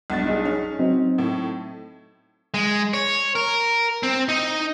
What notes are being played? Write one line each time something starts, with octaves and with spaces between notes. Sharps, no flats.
B1 G2 A6
D#4 G#4
C#4
F#3 C4 D#4
A2
G#3
C#5
A#4
C4
D#4